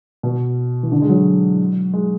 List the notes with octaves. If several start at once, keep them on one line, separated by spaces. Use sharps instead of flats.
B2
E3
D3
G#3
F#3
G#3